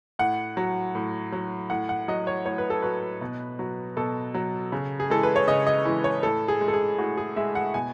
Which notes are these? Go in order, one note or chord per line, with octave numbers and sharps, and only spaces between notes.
A2 F#5
F#3
A2
F#3
A2 F#5
F#5
F#3 D#5
C#5
A2 C#5
B4
A4
F#3 B4
B2
F#3
B2 A4
F#3
C#3
G#4
E3 G#3 A4
B4
C#5
C#3 D#5
D#5
E3 G#3
C#5
A2 A4
G#4
G#3
A4
G#4
A2 F#4
G#4
G#3 E5
F#5
B2 G#5